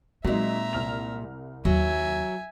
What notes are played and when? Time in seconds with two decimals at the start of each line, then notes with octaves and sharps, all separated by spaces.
0.24 A#2 F#3 G#3 C4 D#4 E5 A#5
0.73 C2 F6 F7
1.65 D#2 F#3 E5 G#5